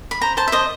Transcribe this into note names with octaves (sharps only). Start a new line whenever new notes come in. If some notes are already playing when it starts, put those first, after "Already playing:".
B5
C5 A#5
C5 A5
E5
C5 D#5